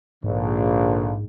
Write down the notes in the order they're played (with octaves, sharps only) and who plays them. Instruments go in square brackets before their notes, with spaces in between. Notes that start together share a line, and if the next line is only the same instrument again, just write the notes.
[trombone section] A#1 D3 [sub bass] G#2